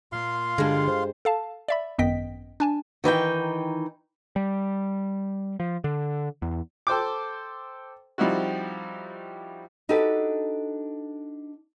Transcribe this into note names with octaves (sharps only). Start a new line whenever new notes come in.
A#2 A#3 F4 F5 C6
G2 D3 G#3 D4
C5
A4 F5 A5
D5 E5 B5
G#1 F#2 B3 D#5 G5 B6
D4 G#5 A5
D#3 E3 D#4 G5
G3
F3
D3
E2
A4 C5 G5 D6
F3 G3 C4 D#4 E4 F#4
D4 D#4 F#4 G4 A4 B4